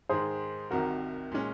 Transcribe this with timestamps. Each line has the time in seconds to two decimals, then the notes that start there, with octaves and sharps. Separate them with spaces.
0.09 G#2 D#3 G#3 G#4 C5
0.71 C2 C3 D#3 F#4 A#4
1.32 A#2 G#3 C#4